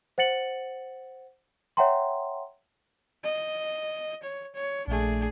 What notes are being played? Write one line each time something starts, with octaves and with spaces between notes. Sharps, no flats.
C5 F#5 A6 C#7 F#7
C#5 E5 F#5 G5 A#5 C6
D#5
C#5
C#5
A#1 A3 D4 G#4